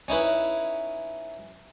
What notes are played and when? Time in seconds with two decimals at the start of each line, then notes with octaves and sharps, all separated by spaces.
0.08 C#4 D#4 E4 B4